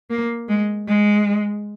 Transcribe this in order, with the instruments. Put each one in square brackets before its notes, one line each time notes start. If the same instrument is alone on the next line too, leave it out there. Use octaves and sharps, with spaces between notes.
[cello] A#3
G#3
G#3